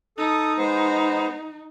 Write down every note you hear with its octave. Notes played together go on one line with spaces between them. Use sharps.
D#4 A4 D#6
G#3 B3 C5